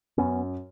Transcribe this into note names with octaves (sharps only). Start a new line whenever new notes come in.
F#2 B3 C#4